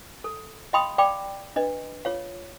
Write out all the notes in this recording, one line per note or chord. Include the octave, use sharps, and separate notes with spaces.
A4
D#5 F5 G5 B5 C6 D#6
D5 F5 G5 B5 D6
D4 B4 D#5
F4 C#5 F5